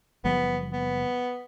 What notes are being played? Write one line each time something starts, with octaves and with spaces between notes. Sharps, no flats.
F#1 F3 G3 B3
B3